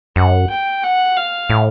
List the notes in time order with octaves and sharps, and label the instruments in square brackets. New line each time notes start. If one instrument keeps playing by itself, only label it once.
[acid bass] F#2 [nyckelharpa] F#5
[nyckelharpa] G5
F#5
F5
[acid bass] A2